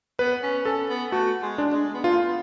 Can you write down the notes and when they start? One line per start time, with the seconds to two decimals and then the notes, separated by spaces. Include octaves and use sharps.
0.19 B3 B4
0.43 C#4
0.65 C#4 A4
0.89 B3
1.12 A3 F#4
1.42 G#3
1.58 D4
1.74 G#3
1.94 B3
2.04 A3 F4
2.27 B3